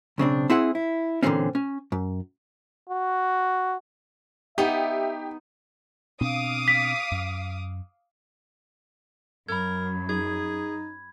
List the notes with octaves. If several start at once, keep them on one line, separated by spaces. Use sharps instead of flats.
B1 C#3 C4 D4
C4 E4 G#4 F#5
E4
A#2 D3 E3 F#3 C4 C#4
C#4
F#2
F#4
B3 D#4 G4 E5
B2 C4 D4 F5 D6 D#6
B6
F#2
F#2 A#4 B5 G#6
D#4 G#4 G#6